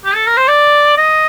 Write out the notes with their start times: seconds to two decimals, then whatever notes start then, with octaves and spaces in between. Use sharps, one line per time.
0.05 G4
0.15 A4
0.27 A#4
0.37 C5
0.48 D5
0.98 D#5